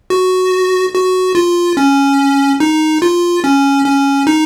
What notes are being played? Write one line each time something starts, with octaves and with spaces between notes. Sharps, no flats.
F#4
F#4
F4
C#4
D#4
F4
C#4
C#4
D#4